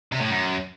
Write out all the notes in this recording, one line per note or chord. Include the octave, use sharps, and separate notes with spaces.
C3
A2
F#2